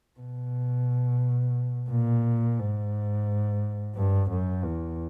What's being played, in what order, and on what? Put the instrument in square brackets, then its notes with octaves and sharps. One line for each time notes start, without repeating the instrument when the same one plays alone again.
[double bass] B2
A#2
G#2
G2
F#2
E2